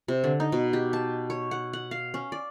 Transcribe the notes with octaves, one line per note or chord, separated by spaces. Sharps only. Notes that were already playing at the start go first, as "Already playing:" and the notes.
C3
D3
D#4
B2
G4
A5
C#5
F#5
F#5
F5
C#4
D5